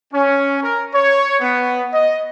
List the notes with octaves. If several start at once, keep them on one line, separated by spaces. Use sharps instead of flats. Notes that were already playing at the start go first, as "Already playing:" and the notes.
C#4
A#4
C#5
B3
D#5